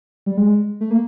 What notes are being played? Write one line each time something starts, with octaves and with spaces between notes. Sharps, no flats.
G3
G#3
A3
A#3